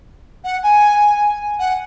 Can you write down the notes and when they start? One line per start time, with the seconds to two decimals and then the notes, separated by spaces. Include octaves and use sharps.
0.44 F#5
0.63 G#5
1.59 F#5